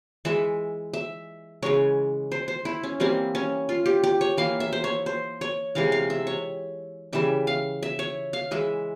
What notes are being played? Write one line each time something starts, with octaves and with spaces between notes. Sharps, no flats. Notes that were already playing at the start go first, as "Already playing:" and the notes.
E3 G#3 E5
E5
C#3 E3 G#3 C#5
C5
C5
E4
C#4
E3 G3 A#3 C4
C#4
F4
G4
G4
C#5
E3 A#3 F5
E5
C5
C#5
C5
C#5
C3 E3 G#3 F5
F5
E5
C#5
C#3 E3 G3 E5
F5
E5
C#5
F5
E3 G#3 E5